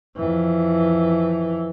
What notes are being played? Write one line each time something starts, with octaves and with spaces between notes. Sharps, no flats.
F2 E3